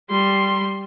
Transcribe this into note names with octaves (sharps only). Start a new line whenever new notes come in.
G3 C6